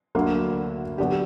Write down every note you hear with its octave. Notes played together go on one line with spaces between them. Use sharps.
D2 D3 F#3 A#3
D3 F#3 B3 D4 G4